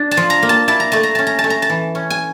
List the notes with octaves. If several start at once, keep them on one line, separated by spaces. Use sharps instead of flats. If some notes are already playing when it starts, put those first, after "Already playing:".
Already playing: D4
A5
F3
A#5
A#3
A5
E4 A5
A#5
A3 A5
A#5
C#4 A5
A#5
A5
A3
A#5
A5
E3
C#4
G#5